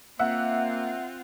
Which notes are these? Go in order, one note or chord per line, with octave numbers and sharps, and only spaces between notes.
A#3 C4 F4 E5 F#5